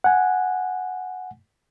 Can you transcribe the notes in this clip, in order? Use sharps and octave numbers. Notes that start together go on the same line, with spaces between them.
F#5 G#5